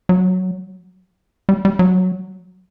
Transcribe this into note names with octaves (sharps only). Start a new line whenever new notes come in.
F#3
G3
G3
F#3